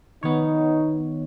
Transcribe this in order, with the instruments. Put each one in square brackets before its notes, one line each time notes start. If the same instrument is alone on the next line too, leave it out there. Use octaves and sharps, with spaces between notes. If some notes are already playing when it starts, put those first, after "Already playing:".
[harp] D#3 [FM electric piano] B3 C#5 [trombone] D#4